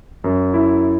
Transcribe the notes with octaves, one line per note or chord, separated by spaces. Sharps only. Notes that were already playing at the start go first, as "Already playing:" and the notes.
F#2
E4